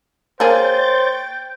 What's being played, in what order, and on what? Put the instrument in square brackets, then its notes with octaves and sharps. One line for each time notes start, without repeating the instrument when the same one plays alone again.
[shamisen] A#3 G#4 [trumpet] C5 [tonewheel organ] C#5 G6 A6 [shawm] G5